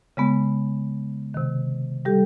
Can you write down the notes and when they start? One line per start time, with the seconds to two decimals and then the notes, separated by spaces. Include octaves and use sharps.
0.17 C#3 G#3 B3
1.34 C3 D#3
2.05 G3 G4 A4